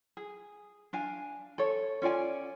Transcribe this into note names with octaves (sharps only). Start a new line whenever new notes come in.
G#4
D4 F5 G#5
A4 C#5
C#4 F4 D5 G#5